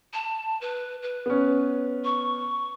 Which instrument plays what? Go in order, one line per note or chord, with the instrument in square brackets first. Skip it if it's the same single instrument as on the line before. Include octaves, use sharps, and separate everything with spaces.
[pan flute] A5
B4
B4
[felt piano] B3 C#4
[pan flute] C#6